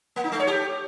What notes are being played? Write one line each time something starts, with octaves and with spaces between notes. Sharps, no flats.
A#3
D#4
A3
C#5
G4